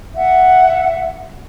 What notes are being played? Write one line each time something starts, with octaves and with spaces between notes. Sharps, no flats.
E5 F#5